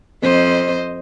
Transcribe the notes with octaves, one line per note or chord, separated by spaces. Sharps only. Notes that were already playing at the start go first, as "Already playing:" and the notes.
F2 C5 D#5